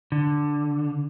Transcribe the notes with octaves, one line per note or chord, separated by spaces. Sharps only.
D3